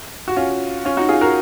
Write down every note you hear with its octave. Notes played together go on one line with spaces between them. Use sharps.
F#4
C#4 F4
C#4 F4
D#4 F#4
F4 G#4
F#4 A#4